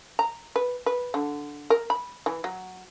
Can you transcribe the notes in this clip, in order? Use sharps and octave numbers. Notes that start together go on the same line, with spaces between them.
A#5
B4
B4
D3
A#4
B5
E3
F#3